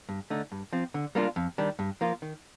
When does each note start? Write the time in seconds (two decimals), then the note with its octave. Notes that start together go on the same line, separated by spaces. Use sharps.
0.09 G2
0.30 D3 A3 D#4
0.52 G2
0.73 F3 C4
0.94 D3
1.15 G3 A#3 D4 F4
1.36 F2
1.58 D#3 G3 D4
1.79 G2
2.01 F3 A#3 F4
2.22 D#3